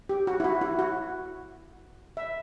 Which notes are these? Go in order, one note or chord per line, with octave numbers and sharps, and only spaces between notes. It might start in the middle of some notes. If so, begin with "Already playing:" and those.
G4
F#4
E4
F#4
E4
F#4
E5